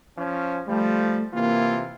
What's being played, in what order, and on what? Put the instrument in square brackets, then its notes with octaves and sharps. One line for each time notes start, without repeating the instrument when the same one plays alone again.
[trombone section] F3 C#4
[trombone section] F3 G3 [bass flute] A3
[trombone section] C3 E3 F4 [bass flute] A#3